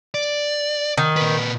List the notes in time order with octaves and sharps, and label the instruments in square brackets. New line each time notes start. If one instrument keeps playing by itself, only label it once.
[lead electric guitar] D5
[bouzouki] D#3
[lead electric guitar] A#2 B4